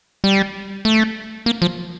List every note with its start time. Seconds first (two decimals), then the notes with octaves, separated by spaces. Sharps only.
0.24 G3
0.85 A3
1.46 A#3
1.62 F3